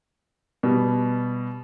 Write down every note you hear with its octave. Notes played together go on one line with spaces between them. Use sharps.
B2 G3